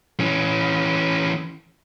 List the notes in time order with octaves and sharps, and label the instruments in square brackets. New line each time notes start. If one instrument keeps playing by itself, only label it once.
[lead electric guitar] E3 C#4